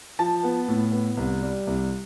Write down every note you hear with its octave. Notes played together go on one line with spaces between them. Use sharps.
F3 A5
B3
A2
B3
C2
G3
C2